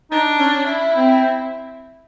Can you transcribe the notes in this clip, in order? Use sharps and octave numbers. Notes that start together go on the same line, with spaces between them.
D4 D#4
C#4
E4
C4